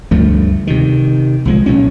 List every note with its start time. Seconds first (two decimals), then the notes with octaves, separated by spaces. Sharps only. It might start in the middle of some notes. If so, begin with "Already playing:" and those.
0.11 D2 G2 F3 A3
0.67 C3 D#3
1.45 C2 F3 G#3
1.66 B1 A#2 C#4